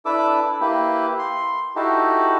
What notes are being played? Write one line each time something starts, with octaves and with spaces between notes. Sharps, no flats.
D4 E4 A4 B4 D6 E6
A#3 E4 G4 B4
C6
D#4 E4 F#4 G4 A4